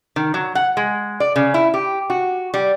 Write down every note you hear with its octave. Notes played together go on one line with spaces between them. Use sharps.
D#3
F#3
F#5
G#3
D5
C#3
E4
G4
F#4
G3